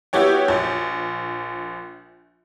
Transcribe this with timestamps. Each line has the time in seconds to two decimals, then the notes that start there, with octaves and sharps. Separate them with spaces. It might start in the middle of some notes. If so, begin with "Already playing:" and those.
0.13 B3 E4 F#4 G4 C#5 G5
0.48 A#1